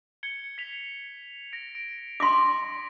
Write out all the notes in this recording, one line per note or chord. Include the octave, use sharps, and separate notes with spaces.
G#6 C#7 G7
B6 F7
A#6 D7
D7
C6 D6 A#6 B6